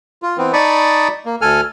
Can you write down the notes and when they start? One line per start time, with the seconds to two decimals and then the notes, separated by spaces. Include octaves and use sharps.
0.22 F4
0.38 E3 B3 C4
0.53 D#4 D5 A5 B5 C#6 D#6
1.25 A#3
1.41 D2 A4 G#5 F6